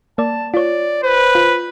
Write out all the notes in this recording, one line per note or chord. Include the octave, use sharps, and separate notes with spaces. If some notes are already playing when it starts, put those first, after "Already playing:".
A#3 D5 A5
F4 C#5 D5
B4 C5
F4